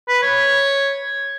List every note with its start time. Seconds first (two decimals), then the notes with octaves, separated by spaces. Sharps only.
0.08 B4
0.23 C#5